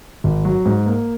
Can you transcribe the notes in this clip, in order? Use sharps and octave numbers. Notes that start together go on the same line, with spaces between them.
G#1
F#3
G#2
A#3